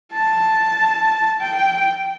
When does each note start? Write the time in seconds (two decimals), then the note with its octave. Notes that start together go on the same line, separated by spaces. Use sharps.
0.13 A5
1.40 G5